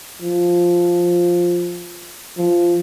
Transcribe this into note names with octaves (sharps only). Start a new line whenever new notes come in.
F3
F3